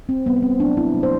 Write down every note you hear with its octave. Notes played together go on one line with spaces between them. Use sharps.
C4
C3 E3 G3 B3
B3
C4
C3 F#3 A3 D4
E4
C3 F#3 A3
C5